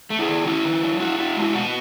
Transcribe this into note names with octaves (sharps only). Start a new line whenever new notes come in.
A3
E4 G#4
D#3
C#4 E4
D#3
F#3
E4 F#4
E4
G#3 E4
B2 F#4